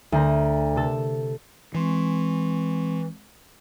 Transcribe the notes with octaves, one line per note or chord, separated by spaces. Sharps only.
D2 C5 A#5
C3 A4
E3 G#3 C4 C#6